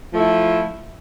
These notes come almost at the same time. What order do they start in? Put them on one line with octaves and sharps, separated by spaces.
F3 A3 E4